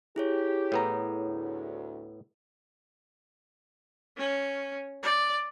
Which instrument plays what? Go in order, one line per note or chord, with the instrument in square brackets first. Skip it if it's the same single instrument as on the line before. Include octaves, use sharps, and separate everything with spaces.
[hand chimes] E4 G#4 C#5 [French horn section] G4
[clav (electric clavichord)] A2 B3 A#5
[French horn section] D2
[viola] C#4
D5